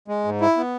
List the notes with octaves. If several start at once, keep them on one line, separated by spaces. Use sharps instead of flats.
G#3
G#2
E4
B3